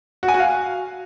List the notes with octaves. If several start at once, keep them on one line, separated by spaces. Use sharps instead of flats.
F#4
G#5
F#4
F5